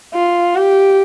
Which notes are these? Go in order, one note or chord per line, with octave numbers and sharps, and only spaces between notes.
F4
G4